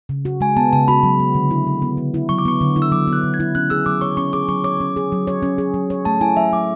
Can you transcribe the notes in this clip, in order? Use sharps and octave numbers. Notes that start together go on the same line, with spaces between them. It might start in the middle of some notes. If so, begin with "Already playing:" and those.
C#3
F#4
G#3 G#5
B3 A5
C#3 A5
F#4 B5
F#3
B3
D3
E4
F#3
B3
D3
E4
F#3 C#6
D6
B3 C#6
D3
E4
E6
F#3 D6
B3
F#6
D3
G#6
E4
C#4 F#6
G#4 E6
F#3 D6
C#5 C#6
C#4 C#6
G#4 D6
F#3 C#6
C#5 D6
C#4
G#4
F#3
C#5
C#4
G#4
F#3
C#5
A3 A5
E4 G#5
F#3 E5
F#3 D6